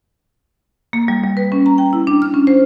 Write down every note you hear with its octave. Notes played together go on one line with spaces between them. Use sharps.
A#3
G3
G3
B4
C#4
A#5
G5
E4
D4
F6
C#4
C5